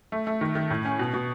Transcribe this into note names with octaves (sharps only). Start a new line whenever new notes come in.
A3
A3
D#3
D#3
A2
C#4
B2
B2